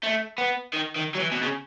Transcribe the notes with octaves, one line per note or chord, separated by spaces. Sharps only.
A3
B3
D#3
D#3
F#3
E3
B2
C#3